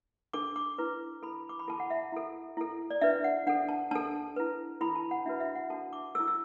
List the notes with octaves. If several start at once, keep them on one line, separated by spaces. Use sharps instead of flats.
D4 A4 D6
D6
E4 B4
E4 A4 B5
D6
B5
E4 A4 A5
F#5
E5
E4 A4
E4 A4
D5
D4 B4 E5
F#5
D4 A4 F#5
A5
D4 A4 A5
E4 B4
E4 A4 B5
A5
F#5
D4 F#4 B4 E5
E5
F#5
D4 F#4 A4 A5
D6
E4 A4 E6
E6